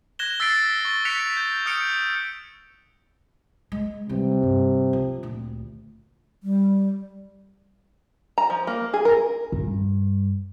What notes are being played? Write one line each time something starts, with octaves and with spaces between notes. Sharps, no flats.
F#6 G#6 A#6 E7 G7
E6 A6 B6 C7 D7
C#6 A6
F#6 B6 C#7 D7 F7
G6
D#6 F6 G6 C#7 D7 F7
G#3
C3 E3 G3
G2
F3
D2 A#2
G3
A#5
F3
A#3
G#4
A#4
G2